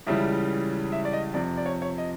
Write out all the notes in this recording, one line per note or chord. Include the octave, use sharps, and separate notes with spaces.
C#2 C#3 E3 G3 E5
E5
D5
D#5
F2 C3 F3 D5
D5
C#5
C#5
D#5